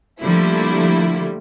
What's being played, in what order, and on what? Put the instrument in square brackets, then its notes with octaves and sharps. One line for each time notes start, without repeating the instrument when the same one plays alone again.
[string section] D3 F3 G3 A3 A#3 E4